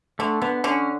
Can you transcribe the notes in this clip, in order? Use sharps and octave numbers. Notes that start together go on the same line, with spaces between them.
D3 A3
D3 B3
D3 C#4